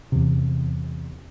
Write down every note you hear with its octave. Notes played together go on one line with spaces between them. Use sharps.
E2 C3